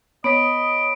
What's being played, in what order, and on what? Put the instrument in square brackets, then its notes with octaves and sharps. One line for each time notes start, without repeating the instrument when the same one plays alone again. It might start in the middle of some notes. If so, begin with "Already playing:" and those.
[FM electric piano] B3 C#5 [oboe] D#5 [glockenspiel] B5 [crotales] B6 D7